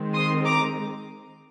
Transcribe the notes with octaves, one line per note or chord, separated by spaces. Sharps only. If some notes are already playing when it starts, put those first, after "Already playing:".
Already playing: D#3 G#3 C4
C6 D#6
A#5 D6